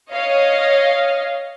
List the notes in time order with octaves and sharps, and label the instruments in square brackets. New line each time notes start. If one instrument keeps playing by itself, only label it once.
[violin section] C#5 D#5 F5